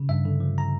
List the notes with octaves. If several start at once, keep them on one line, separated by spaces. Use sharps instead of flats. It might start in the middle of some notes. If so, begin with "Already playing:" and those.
Already playing: C#3
G2 E5
D3
F3
A#5